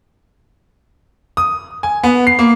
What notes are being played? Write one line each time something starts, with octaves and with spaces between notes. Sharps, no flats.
D#6
G#5
B3
C7
A#3